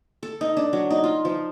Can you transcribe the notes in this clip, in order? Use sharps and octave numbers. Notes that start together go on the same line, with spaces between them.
A4
D#4
D4
F#3
D#4
F4
F3